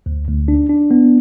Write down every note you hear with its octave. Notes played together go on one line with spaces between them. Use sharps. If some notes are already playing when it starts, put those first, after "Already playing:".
D2
D2
D4
D4
B3